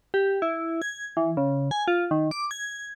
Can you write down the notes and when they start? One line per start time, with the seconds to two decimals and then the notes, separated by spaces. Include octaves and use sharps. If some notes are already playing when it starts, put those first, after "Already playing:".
0.14 G4
0.42 E4
0.82 G#6
1.17 E3
1.37 C#3
1.71 G#5
1.88 F4
2.11 D#3
2.31 D6
2.51 G#6